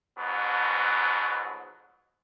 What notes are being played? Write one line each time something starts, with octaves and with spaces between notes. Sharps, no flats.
F2 G#2 B2 F#3 B3